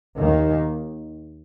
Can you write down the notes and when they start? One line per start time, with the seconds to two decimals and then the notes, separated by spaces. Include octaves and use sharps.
0.18 D#2 D#3 A#3